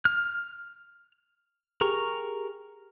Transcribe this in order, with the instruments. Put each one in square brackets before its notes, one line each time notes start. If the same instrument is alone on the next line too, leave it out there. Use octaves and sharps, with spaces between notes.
[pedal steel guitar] F6
[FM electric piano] G4 G#4 [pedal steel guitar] A#4 A#5 C#6